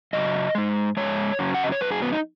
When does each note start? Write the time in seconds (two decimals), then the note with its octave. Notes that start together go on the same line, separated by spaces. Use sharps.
0.13 F#2 C#3 F#3 D#5
0.55 G#2 G#3
0.97 G#2 G#3 C#5
1.39 F#2 C#3 F#3
1.54 F#5
1.63 D#5
1.72 C#5
1.81 F#2 F#3 B4
1.91 G#4
2.02 B3
2.12 D#4